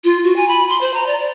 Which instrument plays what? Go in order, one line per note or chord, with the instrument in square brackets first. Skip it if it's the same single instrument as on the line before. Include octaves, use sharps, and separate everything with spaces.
[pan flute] F4
F#4
G#5
B5
C6
C5
A#5
D5
D5